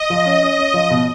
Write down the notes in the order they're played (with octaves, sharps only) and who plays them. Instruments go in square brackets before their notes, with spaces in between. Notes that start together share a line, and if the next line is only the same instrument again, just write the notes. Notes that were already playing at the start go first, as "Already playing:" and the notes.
Already playing: [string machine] D#5
[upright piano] F3
C#4
C#4
C#4
F3
B2